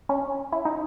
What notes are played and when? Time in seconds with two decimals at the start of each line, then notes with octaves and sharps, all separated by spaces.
0.09 C#4
0.52 E4
0.65 D#4